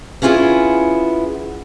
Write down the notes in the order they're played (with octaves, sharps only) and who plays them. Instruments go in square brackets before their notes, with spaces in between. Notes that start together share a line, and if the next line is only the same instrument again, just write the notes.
[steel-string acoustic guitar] B3 C#4 E4 F4 G4 G#4